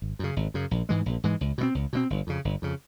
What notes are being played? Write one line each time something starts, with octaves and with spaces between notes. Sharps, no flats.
G#1
F#2 C#3
G#1
F#2 C#3
A#1
G#2 E3 G#3
A#1
G#2 E3 G#3
C#2
B2 G#3 C4
C#2
B2 G#3 C4
G1
F2 C#3
G1
F2 C#3